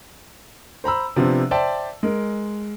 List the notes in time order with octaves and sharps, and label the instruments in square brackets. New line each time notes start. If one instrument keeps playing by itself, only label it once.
[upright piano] C5 A#5 B5 E6
C3 F3 B3 C4 D4
C5 D5 E5 G5 A5
G#3 A#4